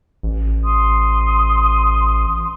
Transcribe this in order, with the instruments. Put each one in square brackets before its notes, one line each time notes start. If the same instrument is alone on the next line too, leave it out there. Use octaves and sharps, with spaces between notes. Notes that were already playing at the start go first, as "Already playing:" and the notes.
[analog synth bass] A1
[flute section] C6 D#6